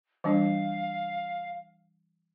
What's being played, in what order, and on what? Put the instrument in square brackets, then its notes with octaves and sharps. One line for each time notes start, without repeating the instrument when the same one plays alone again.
[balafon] E3 G3 D4 [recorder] F5